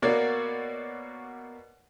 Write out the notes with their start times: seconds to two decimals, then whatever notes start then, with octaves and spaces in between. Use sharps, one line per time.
0.02 B2 A#3 F#4 C#5 D5